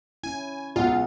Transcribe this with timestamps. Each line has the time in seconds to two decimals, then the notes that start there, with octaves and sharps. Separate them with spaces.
0.24 C#4 E4 G#5
0.76 B1 G#3 B3 F4 F#5